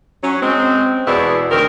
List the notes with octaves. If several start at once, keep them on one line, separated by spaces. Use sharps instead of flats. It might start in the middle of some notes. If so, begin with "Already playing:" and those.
F#3 C#4
G#3 C4
E2 B2 E4 G#4 D5
D2 D#3 C4 A#4